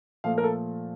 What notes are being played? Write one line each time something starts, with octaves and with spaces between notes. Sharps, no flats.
A#2 F3 A3 F5
A#4
A4